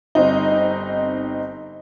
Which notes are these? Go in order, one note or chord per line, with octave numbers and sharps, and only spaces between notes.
G1 C4 D#4